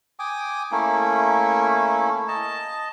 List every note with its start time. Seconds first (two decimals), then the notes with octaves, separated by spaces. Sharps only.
0.19 G5 G#5 D6 D#6
0.72 A3 A#3 C#4 E4
2.28 D#5 A5